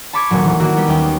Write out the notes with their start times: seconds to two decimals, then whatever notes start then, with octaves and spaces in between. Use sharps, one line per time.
0.13 A5 B5 C#6 D6 G#6
0.31 D#1 A1 A#2 F#3
0.44 E3
0.60 D#3 A#3 E4 F#4
0.77 G3 B3 G4
0.88 D#2 C#4 G5